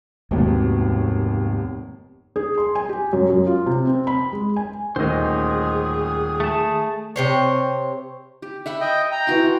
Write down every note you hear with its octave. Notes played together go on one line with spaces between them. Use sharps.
F1 D#2 G#2 B2
G#4
C6
G#5
G4
F#2
F#2
F4
C3
C4
B5
G#3
G#5
D#1 D2 D#3 G#4 C5 D#5
A3 A5
C3 C5 C#5
G4
E5 F#5 B5
D#5 G5
G5 A#5
E3 F#4 C6